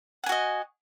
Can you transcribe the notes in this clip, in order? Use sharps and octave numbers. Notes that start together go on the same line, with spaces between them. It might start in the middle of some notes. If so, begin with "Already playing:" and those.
F#4 D#5 F#5 G#5